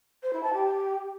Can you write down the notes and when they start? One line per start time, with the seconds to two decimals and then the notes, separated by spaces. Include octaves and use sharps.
0.23 C5
0.33 E4
0.43 A5
0.53 G4